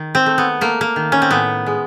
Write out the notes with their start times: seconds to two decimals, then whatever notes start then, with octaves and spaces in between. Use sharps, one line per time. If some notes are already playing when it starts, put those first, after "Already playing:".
Already playing: D#3
0.15 C4
0.26 A3
0.38 B3
0.61 A3 A#3
0.81 A#3
0.96 D#3
1.12 C#4
1.22 C4
1.31 A2 B3
1.66 G#3